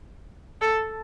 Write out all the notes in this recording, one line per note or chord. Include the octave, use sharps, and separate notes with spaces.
A4